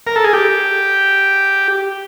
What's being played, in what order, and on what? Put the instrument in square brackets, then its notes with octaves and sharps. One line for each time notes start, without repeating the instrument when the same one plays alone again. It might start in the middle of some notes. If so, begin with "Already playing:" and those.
[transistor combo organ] A#4
A4
G#4
G4